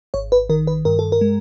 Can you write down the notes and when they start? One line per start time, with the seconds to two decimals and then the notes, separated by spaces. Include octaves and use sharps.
0.14 G#1 C#5
0.32 B4
0.49 D#3 A#4
0.67 B4
0.85 G2 A#4
0.99 A4
1.12 A#4
1.21 G#3